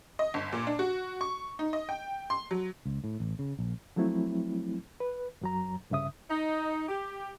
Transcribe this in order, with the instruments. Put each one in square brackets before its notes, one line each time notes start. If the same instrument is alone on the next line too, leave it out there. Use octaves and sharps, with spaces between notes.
[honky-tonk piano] D#5
G1
A#2
D4
F#4
C#6
D#4
D#5
G5
C6
F#3
[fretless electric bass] C#2
A2
A1
C#3
A#1
[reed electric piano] F3 F#3 A3 C4 E4
B4
F#2 F#3 A#5
C2 G2 C#3 E5 D#6
[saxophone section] D#4
G4